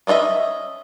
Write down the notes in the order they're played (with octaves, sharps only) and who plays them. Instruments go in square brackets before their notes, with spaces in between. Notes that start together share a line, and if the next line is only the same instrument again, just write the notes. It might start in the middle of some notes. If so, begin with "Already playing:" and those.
[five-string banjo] C#4 D#4 F4 D#5 E5